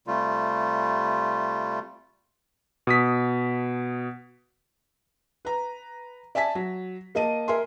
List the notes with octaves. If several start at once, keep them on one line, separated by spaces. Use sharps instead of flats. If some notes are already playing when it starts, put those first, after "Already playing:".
C3 G3 A3 F4
B2 D#6 B6
B4 A#5
D5 E5 G#5 A5 B6
F#3
A#3 D#5 A5 D#7
A#4 E5 G#5 C6